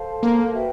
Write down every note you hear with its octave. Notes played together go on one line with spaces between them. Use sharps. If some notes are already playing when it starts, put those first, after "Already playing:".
Already playing: A4 C5 F5 A5
A#3
F#4 B4 E5 G5